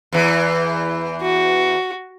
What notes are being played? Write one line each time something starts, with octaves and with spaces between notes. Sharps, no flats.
E2 E3
F#4